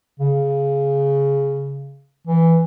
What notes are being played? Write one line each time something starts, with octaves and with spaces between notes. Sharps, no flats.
C#3
E3